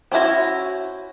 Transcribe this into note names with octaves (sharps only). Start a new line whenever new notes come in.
C4 C#4 E4 F#4 C5